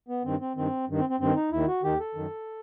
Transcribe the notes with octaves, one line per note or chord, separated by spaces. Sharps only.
B3
G2 D#3 C4
C4
G2 D#3 C4
G2 D#3
C4
C4
G2 D#3 C4
D#4
D#2 D#3 E4
F#4
D#2 D#3 G4
A4
F#2 D#3